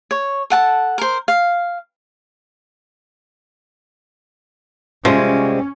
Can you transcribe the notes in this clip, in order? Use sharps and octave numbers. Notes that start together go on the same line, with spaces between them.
C#5
A4 F#5 A5
A#4 C5
F5
C3 F3 G3 G#3 C#4